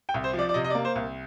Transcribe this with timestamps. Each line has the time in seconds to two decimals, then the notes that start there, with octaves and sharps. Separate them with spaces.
0.09 G5
0.14 C2
0.24 C5
0.34 F3
0.39 D5
0.49 D5
0.54 C3 D#5
0.64 D#5
0.70 D5
0.75 A#3
0.85 C5
0.96 C2